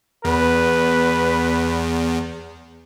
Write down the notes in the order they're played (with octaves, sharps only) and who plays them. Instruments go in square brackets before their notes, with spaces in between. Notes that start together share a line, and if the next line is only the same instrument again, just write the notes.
[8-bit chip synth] E2 [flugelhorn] B4